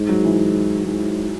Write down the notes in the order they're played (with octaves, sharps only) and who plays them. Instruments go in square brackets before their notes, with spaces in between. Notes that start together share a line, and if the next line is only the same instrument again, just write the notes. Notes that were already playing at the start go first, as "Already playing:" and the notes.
Already playing: [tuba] G#2
[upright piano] F#3
E3
[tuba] G#2